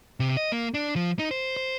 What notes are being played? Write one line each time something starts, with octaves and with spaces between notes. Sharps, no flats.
C3
D#5
A#3
D4
F3
D#4
C5
C5